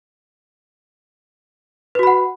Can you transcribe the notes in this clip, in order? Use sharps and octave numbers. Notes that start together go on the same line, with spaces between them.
F#4 B4 F#5 B5